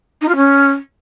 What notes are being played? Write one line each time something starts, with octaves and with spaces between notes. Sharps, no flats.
D#4
F4
C#4